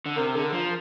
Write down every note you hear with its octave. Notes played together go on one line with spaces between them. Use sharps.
D3
C3 A#4
D3 G#4
A#4
F3